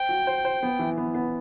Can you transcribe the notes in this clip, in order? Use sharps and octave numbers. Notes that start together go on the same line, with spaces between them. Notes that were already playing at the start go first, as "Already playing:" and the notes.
Already playing: C5 G5
F#4
C5
C5
B3
E3
B3
B3